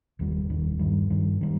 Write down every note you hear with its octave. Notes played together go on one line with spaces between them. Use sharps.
F1 D#2 D#3 G3
F1 D#2 D#3 G3
G2 D#3 G3
G2 D#3 G3
D#3 G3